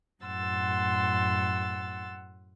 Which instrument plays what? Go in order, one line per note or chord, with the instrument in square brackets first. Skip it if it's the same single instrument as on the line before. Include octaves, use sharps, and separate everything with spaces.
[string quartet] F#2 A2 F#5 C6 E6 A6